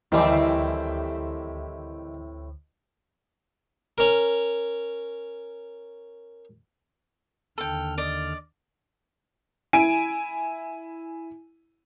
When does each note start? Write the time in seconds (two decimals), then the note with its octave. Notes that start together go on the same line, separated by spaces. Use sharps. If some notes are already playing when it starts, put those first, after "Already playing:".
0.12 D2 A2 D#3 E3 G3 C4 E4 G4
3.98 C#4 A#4
7.58 D#2 D3 A4 G5 F6
7.98 D5 D#5
9.73 E4 G#5 D7